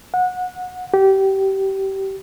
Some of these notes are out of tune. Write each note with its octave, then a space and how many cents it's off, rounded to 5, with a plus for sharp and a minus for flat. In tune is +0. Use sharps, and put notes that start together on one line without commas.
F#5 -25
G4 -25